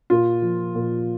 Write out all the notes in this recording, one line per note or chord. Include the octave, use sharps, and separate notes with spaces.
A#2 F4
F3
A#2